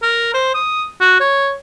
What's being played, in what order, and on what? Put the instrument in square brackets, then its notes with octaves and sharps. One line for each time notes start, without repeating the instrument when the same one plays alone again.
[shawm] A#4
C5
D#6
F#4
C#5